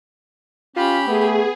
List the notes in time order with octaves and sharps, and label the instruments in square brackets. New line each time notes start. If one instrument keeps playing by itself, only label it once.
[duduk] C#4 [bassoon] F4 [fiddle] G4 B5
[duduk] A3 [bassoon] B3 [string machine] G#4